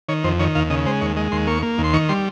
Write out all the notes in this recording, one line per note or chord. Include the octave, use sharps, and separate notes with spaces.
D#3 C#5
F2 C5
D#3 C#5
D#2 F5
C#3 D#5
G#3 C5
D#2 C#5
G#3 D#5
D#2 C6
A#3 C#6
A#3
D#2
C6
D#3 C#6
G3 C6